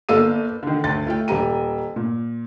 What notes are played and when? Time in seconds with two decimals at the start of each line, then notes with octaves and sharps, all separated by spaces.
0.09 G1 A#3 A4 F5 E6 D#7
0.63 D3 D#3
0.84 D2 A6
1.07 A3 F4 G5
1.28 D#1 G3 A#5 D#7
1.96 A#2